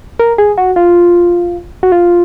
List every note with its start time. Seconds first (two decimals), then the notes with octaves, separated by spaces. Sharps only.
0.20 A#4
0.38 G#4
0.58 F#4
0.76 F4
1.83 F#4
1.92 F4